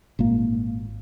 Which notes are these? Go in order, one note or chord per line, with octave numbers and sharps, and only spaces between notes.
G#1 A#2 A#3